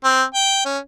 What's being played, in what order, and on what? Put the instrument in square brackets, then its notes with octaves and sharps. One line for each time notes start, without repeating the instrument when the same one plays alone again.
[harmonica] C4
G5
C#4